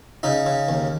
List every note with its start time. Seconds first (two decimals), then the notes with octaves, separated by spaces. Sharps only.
0.23 C#3 D#4
0.46 C#3
0.69 D#2